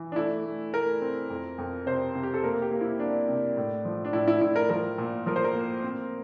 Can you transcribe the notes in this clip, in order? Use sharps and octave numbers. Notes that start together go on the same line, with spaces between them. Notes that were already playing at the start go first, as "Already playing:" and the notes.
Already playing: E3
D4
A3 E4
A3
A3 A#4
C4
F2
F2
C3 C5
C3
G4
A4
A#3 A#4
G4
A#3
E4
A#3 D4
C3
A2
F3
D4
A2 E4
E4
A2 E4
A#4
F3 A#4
A#2
F3 A#4
C5
A#4
A#3
C4